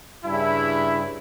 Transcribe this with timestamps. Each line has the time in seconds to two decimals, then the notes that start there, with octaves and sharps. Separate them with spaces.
0.24 G2 C#3 E4